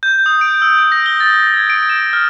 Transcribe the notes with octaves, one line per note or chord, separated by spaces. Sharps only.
G6
D#6
D7
E6
D7
A#6
G7
A6
G#6
D7
E7
F6